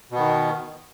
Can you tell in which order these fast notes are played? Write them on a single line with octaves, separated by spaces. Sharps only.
B2 B3 D#3